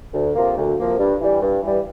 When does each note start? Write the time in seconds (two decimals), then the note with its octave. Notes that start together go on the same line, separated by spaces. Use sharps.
0.14 D2
0.35 C3 F3 A#3
0.57 D2
0.78 C3 F3 A#3
0.99 G2
1.20 E3 G3
1.41 G2
1.62 E3 G3